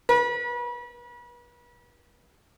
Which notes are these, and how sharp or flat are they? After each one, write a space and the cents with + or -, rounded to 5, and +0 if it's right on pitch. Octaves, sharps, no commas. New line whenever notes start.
B4 -35